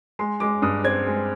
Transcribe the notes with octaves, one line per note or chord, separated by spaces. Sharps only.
G#3 C6
G#3 D6
G2 D#6
C4 G#6
G#3